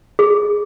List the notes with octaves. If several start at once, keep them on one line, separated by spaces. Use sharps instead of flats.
G#4